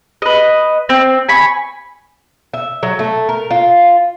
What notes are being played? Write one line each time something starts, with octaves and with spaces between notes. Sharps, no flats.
B4 D#5
C4
G#5 B5 C#6
E5
F#3
A3
A#4
F4